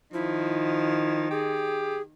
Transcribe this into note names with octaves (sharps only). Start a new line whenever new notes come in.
D#3 F3 E4
G4 G#4